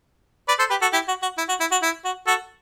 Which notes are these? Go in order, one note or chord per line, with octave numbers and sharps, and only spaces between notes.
B4 D5
A4 C5
G4 B4
F#4 A4
E4 G4
F#4
F#4
E4
F#4
E4
F#4
E4
F#4
F#4 A4